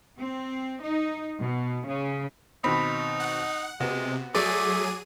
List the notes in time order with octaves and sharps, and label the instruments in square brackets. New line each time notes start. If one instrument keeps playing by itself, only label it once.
[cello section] C4
D#4
B2
C#3
[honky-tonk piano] B2 D#3 C4 [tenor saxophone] D#4 [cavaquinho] B5
[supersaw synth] F#5
[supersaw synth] C3 [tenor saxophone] G#3 [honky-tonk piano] B3 F#4
[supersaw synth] F#3 G#4 D#7 [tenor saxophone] A3 [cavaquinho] D5 [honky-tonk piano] D6